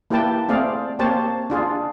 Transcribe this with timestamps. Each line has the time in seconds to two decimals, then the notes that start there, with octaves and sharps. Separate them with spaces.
0.10 A#3 E4 G4 B4 G5 A5
0.48 A3 C4 G#4 D5 F5
0.99 A#3 C4 G4 C5 C#5 A5
1.50 D4 F4 G#4